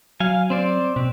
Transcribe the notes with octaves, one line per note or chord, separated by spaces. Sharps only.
F#3 F5 G#5
C4 C5 D5
B2 C4